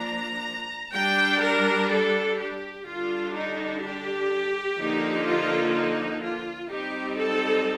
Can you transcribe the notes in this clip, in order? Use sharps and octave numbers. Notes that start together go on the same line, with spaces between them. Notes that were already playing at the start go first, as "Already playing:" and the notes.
Already playing: F3 A#3 D4 A#5
G3 D4 G5
A#4
A4
G4
D3 G3 D4 F4
D#4
G4
D3 F3 A#3 D#4
F4
D#4
F4
G3 C4 D#4 G4
A4